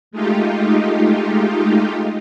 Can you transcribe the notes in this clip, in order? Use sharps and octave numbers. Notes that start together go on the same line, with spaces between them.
G#3 A3 D#4 F4 G4